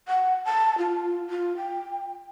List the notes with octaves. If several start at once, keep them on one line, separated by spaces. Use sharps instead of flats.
F#5
A5
F4
F4
G5